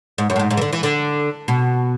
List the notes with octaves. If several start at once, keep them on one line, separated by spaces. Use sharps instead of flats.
G#2
F#2
A2
G#2
G#2
E3
D3
E3
D3
B2